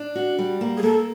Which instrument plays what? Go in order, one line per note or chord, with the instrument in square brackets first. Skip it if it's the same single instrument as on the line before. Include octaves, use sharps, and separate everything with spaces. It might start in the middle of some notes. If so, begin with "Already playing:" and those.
Already playing: [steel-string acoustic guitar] D4
F#4
G3
A#3
[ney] G#4
[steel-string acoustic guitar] A#3 [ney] A4